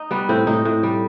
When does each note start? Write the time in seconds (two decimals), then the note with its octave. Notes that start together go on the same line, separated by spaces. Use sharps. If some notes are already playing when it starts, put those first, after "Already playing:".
Already playing: D#4
0.11 G3 B3
0.29 A2 C4
0.47 A2 D#4
0.65 A2
0.83 G3